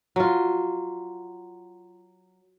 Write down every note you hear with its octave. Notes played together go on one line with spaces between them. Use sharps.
F#3 F4